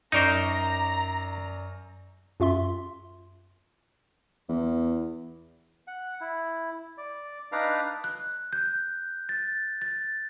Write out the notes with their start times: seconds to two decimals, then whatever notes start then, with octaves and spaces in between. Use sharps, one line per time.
0.12 F#2 D#4 A#4 C5 D5 A#5 C#6
2.40 F#2 F4 E5 C6
4.49 E2
5.87 F#5
6.21 E4
6.98 D5
7.52 D4 D#4 B4 D5 F5 A#5
8.04 F#6
8.53 G6
9.29 A6
9.82 A6